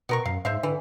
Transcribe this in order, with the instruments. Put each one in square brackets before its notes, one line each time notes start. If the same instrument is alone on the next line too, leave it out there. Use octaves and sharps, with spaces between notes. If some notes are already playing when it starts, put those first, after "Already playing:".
[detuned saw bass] B2 [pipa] B3 A#4 C#6
[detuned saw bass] F#2 [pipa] F5
[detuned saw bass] G#2 [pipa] C5 E5 F5
[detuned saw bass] D3 [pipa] E3